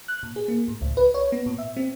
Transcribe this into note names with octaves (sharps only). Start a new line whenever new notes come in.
F#6
A#2
G#4
A#3
A2
C#2
B4
C#5
B3
A#2
E5
C4